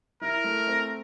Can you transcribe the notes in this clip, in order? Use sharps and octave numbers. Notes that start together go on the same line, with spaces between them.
E4 A#4
A3
C4